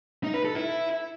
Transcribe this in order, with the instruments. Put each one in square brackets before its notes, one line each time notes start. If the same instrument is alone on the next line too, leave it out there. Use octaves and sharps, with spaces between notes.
[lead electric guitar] D#4
B4
A4
E4